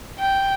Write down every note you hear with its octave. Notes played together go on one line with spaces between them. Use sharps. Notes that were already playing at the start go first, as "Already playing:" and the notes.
G5